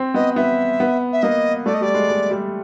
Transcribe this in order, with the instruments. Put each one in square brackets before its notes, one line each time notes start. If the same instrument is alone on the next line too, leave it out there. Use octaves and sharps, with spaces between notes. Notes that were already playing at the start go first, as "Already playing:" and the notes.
Already playing: [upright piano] C4
[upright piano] B3 [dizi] D#5
[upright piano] B3 [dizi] E5
[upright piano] B3
[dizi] E5
[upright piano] A#3 [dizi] D#5
[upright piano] A3 [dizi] D5
[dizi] D#5
[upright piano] G3 [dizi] D5
[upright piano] G#3
G#3
G3